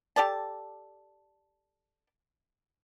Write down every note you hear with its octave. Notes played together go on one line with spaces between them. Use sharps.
G4 A4 D5 A5